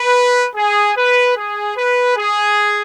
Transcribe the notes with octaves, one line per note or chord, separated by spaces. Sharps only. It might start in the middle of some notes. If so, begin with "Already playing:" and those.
Already playing: B4
G#4
B4
G#4
B4
G#4